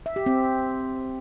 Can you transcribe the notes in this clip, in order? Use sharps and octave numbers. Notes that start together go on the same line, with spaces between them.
E5
G4
C4